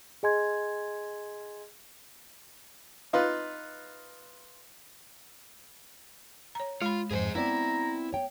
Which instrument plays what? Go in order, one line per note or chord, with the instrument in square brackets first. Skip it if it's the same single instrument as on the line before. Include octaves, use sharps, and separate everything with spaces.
[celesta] G#4 D#5 G#5 C6 G#6
[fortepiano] D#4 F4 B4
[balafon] C#5 A#5
[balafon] G#3 B5 [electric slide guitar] F4
[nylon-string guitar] F2 G#2 [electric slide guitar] G#4 B4 C5
[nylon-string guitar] B3 C4 D5 [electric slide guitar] E4 [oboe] A#5
[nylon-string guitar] C#5 G5